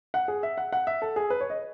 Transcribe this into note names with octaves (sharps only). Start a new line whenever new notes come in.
F#5
G#4
E5
F#5
F#5
E5
A4
G#4
B4
C#5
D#5